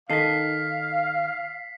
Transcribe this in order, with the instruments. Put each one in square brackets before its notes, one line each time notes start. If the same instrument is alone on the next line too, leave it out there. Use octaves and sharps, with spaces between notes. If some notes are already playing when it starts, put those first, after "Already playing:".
[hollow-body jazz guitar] D#3 D#4 A4 [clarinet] F5 [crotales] B6 C7